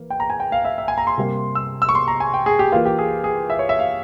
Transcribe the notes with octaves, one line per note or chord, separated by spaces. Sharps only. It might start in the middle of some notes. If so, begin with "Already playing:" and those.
Already playing: E3 A#3
G5
A#5
G#5
G5
F5
E5
E5
G#5
A#5
C6
C3 G3 A#3
E6
E6
C#6
C6
A#5
G#5
G5
G#4
G4
E3 A#3 F4
G4
G#4
G#4
E5
C#5
E5
F5